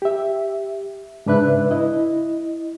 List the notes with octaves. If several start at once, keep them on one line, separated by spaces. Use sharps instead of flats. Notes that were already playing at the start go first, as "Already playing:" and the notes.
G4 E5
G#2 C#3 D4 B4 E5 F#6
E4 D#5